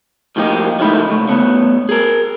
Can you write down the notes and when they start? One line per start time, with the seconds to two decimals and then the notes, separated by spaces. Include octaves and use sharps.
0.36 A2 D#3 F3 A#3 D#4 G4
0.79 C#2 D#3 F3 A3 E4 B5
1.08 C#3 A3
1.28 C2 A3 B3 C#5
1.89 G#4 A#4